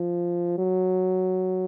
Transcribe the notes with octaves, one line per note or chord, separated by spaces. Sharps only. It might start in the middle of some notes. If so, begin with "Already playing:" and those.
Already playing: F3
F#3